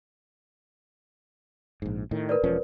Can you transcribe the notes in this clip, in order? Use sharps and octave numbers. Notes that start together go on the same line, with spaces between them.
A#1 G#2
A2 D#3
A#4 B4 D5
E1 F3 C#4